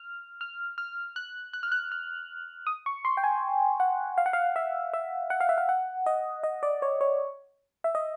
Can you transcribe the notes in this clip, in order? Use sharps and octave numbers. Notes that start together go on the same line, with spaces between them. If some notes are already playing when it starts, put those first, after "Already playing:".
Already playing: F6
F6
F6
F#6
F#6
F6
F#6
F6
D#6
C#6
C6
G5
G#5
F#5
F5
F#5
F5
E5
E5
F#5
F5
E5
F5
F#5
D#5
D#5
D5
C#5
C#5
E5
D#5